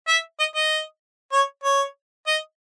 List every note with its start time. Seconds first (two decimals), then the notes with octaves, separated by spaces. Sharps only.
0.08 E5
0.40 D#5
0.55 D#5
1.33 C#5
1.64 C#5
2.27 D#5